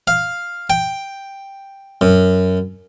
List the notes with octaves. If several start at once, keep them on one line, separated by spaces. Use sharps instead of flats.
F5
G5
F#2